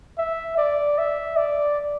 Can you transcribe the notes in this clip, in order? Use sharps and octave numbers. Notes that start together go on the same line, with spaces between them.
E5
D5
E5
D5